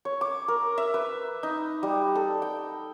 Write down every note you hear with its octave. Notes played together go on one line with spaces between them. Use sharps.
C#5
D6
A#4
E5
B4
D#4
G3
A4
G5